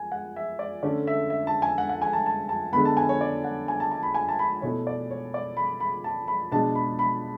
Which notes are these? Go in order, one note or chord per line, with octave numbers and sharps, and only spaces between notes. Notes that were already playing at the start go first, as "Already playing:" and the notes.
Already playing: G#5
F#5
E5
D5
D3 A3 C#4 D5
E5
E5
A5
G#5
F#5
F#5
G#5
A5
A5
A5
D3 G#3 B3 B5
A5
G#5
C#5
D5
F#5
G#5
A5
A5
B5
G#5
A5
B5
B2 A3 E4 C#5
D5
C#5
D5
B5
B5
A5
B5
B2 G#3 D4 A5
B5
B5